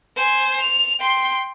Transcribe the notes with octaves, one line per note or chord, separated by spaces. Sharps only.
C5 G#5
F7
G5 C6